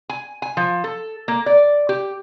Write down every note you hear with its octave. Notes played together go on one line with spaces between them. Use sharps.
G#5
G#5
F3
A4
A#3
D5
G4